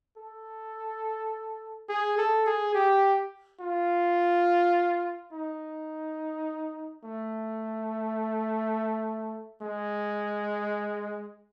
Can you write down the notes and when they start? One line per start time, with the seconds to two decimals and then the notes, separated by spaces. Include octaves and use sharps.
0.17 A4
1.89 G#4
2.18 A4
2.46 G#4
2.74 G4
3.60 F4
5.32 D#4
7.04 A3
9.62 G#3